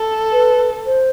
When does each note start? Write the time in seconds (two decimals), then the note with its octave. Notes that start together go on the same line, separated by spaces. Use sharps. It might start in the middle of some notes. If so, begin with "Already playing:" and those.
Already playing: A4
0.31 B4
0.85 C5